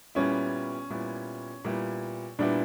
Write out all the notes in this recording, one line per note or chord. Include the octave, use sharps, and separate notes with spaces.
A#2 G3 B3 C#4 E4
A#2 G3 B3 E4
A#2 G3 B3 E4
A#2 G3 B3 D4 E4